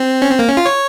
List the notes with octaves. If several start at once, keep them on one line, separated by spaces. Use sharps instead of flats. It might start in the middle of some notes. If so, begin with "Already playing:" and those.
Already playing: C4
C#4
C4
A#3
C#4
F4
C#5